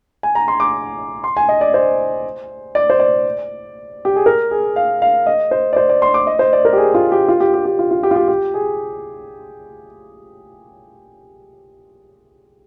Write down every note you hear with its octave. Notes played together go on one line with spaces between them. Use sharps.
G#5
A#5
C6
D6
C6
G#5
D#5
D5
C5
D5
C5
D5
G4
G#4
A#4
G#4
F5
F5
D#5
C5
D5
C5
D5
C6
D6
D#5
C5
D5
A#4
G4
G#4
F4
G4
F4
G4
G4
G4
F4
F4
G4
F4
G4
G4
G#4